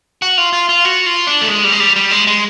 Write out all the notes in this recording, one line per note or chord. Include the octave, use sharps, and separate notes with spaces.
F#4
F4
F4
F4
F#4
F4
D4
A3
G#3
G3
G#3
G3
G3
G#3
G#3